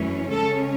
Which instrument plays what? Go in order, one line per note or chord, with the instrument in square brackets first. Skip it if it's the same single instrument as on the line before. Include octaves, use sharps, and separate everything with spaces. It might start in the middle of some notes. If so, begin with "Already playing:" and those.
Already playing: [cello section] F#2 E3 A3 C#4
C#3 G#3 C#4 A4